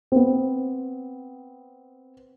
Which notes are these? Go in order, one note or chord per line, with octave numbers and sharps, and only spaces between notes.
B3 C4